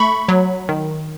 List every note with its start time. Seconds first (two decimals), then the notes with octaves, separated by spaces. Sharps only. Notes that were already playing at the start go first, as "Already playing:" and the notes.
Already playing: A3 B5 C#6
0.28 F#3
0.69 D#3